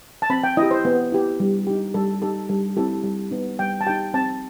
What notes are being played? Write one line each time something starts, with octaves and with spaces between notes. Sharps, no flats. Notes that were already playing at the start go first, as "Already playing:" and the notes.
A5
C4 B5
G5
E4 G4 D#5
C5
B3
E4 G4
G3
D#4 G4
G3 A4
D#4 G4 A4
G3 A4
C4 E4 G4 A4
G3
B3 D#4
G3 G5
A5
D#4 G4 G5
C4 A5